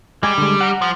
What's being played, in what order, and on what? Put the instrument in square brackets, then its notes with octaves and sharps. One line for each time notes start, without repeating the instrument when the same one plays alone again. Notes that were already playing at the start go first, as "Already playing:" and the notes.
[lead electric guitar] G3 [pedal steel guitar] G#3 G#4
[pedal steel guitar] D3 G#3
F#5 A#5
[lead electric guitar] F3